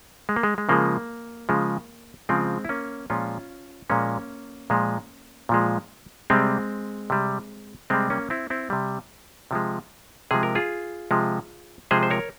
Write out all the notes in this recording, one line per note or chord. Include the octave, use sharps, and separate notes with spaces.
G#3
A#3
G#3
G#3
C#3 F3 G#3 A#3
C#3 F3 G#3
C#3 F3 G#3 C4
E4
A#3 C#4
A#2 F3 G#3 C#4 F4
A#2 F3 G#3 A#3 C#4
A#2 F3 G#3
A#2 F3 G#3
C3 G3 G#3 C4
C3 G3
C3 G3 G#3 C4
A#3 C#4
C4 E4
C4 E4
C3 G3
C3 F3 G#3
C3 F3 G#3 G#4
A#4
F4 G#4
C3 F3 G#3
C3 F3 G#3 G#4 C5
C5
A#4 C#5